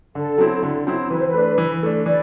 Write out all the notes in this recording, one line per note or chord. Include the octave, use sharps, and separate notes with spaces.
D3 A4
F#3 C4 E4
D3
F#3 C4 E4
E3 B4
C5
B4
A3 D4
E3
A3 D4
E3 B4 D5